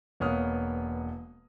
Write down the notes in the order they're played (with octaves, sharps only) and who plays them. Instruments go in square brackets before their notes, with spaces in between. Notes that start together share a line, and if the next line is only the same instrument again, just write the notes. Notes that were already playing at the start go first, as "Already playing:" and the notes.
[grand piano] E1 A#3 B3 C#5 D#6 F6